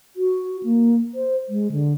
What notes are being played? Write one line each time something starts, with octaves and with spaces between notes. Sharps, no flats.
F#4
A#3
C5
G#3
D3